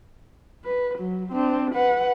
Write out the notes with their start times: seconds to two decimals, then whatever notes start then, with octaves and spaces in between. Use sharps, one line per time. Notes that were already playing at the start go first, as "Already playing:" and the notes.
0.64 B4
0.98 F#3
1.32 C4 D4
1.74 B4 F#5